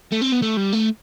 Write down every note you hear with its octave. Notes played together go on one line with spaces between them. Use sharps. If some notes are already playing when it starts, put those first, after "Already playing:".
A3
C4
B3
A3
G3
A3